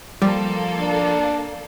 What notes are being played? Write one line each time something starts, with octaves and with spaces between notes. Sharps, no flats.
F3 G3 A#3 A4
D4